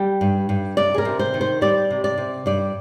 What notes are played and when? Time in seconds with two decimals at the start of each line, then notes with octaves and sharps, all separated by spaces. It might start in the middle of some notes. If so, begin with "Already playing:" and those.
Already playing: G3 G5
0.21 G2
0.49 G2
0.77 C3 D5
0.94 G#4
0.98 A#4
1.05 C3
1.19 C5
1.34 D#3
1.41 C5
1.61 G3 D5
1.90 C3
2.04 D5
2.17 C3
2.46 G2 D5